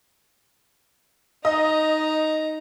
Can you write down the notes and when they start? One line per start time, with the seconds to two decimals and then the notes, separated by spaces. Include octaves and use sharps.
1.45 D#4 D#5 A#5